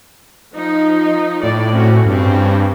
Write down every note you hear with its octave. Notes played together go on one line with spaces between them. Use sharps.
F3 D#4
A2 D5
C4 C#4 F#4
G2 C4 C#4